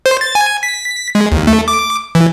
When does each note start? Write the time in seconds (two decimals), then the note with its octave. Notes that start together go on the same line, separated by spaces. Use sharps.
0.06 C5
0.21 A6
0.35 G#5
0.63 B6
1.15 G#3
1.32 D#2
1.47 A3
1.68 D6
2.15 E3